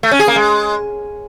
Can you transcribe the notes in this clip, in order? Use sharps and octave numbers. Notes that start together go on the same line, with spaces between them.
A3
C#4
G#4
A#3
G#3